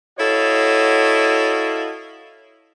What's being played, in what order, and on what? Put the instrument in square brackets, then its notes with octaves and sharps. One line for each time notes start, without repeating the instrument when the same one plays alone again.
[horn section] E4 F#4 A4 C#5 D#5 F5